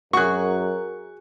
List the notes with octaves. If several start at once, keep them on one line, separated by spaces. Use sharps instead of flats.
F#2 F#4 G#4 A#4 C#6 F#6